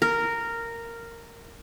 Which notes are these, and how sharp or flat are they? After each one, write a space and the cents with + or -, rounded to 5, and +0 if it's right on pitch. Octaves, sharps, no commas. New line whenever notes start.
A#4 -10